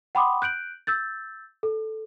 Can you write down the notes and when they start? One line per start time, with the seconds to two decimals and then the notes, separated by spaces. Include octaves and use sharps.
0.15 F#5 G5 B5 C6 D6 D#6
0.42 F#6 G6 D7 F#7
0.87 E6 G6 A6
1.63 A4